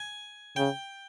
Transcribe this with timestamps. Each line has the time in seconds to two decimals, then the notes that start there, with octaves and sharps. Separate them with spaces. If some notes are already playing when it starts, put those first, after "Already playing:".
Already playing: G#5
0.56 C#3 G5